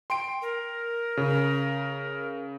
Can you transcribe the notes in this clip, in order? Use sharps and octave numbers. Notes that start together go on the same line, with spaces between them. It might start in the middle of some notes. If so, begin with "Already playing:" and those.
G5 C6 D7
A#4
C#3